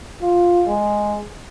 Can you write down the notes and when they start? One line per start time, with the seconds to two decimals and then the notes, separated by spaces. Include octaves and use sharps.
0.21 F4
0.66 G#3